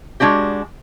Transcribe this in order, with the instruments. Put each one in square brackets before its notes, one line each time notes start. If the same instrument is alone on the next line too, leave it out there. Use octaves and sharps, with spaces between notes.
[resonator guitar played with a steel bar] G#3 C4 D4 F#4 G4